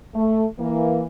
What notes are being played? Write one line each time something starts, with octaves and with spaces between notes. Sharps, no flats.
A3
E3 A#3